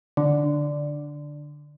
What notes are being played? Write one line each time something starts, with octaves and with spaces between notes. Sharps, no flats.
D3